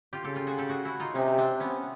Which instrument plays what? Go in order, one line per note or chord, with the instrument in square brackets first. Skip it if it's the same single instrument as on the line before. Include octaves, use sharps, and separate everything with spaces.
[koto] F4 G4
[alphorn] C#3 [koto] G4 A4
[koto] F4 G4
F#4 G#4
G4 A4
F#4 G#4
E4 F#4
D#4 F4
[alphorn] C3 [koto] C#4 D#4
[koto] C4 D4
B3 C#4